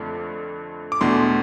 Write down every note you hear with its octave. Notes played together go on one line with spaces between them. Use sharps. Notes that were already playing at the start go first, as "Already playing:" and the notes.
Already playing: F2 D3 A3 D4
D6
E2 B2 A3 D4 C6